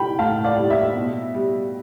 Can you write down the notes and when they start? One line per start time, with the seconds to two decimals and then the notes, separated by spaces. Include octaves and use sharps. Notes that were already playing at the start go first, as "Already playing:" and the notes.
Already playing: G3 G5 B5
0.19 A2 F5 A5
0.44 D5 F5
0.58 G3
0.70 E5
0.96 B2
1.34 G3